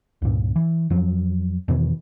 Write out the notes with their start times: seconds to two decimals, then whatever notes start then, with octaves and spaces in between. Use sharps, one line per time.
0.22 C#2 G2 A#2
0.56 E3
0.90 F2 F3 F#3
1.68 E2 B2 D#3 E3